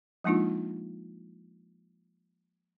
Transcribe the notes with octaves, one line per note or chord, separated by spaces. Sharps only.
F3 G#3 A#3 D4 D#4 F4